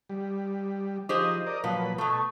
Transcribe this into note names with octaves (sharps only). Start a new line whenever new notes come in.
G3
F3 D#4 G4 G#4 C5 D#5
A#4 D5 D#5
A#2 F3 F#3 B4
B2 A3 A4